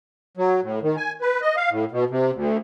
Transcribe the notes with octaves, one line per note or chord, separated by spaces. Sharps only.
F#3
A2
D#3
G#5
B4
D#5
F5
A2
B2
C3
D2